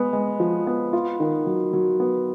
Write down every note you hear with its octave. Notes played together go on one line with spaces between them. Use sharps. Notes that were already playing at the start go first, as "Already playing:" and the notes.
Already playing: G#3 B3
G#3
F3
B3
F4
D#3
F#3
F#3
B3